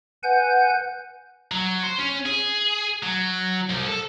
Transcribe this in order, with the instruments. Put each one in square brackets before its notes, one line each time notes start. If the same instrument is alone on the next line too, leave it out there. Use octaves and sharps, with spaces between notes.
[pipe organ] B4 F#5 G#5 G6
[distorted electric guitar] F#3
C5
C#4
G#4
F#3
C2
A4